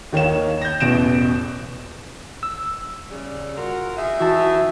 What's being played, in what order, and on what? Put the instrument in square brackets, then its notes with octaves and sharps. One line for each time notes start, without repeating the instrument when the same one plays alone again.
[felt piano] D#2 D#3 C#5 F5 E7
G6 A#6
A1 E2 B2 D7 E7
[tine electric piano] E6
[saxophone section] C#3 G3
F4 F#4 A#4
D#4 G#4 E5
[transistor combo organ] E3 [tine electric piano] F#4 A5